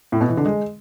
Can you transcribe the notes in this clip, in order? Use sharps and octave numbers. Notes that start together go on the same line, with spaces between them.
A2
B2
E3
D3
G#3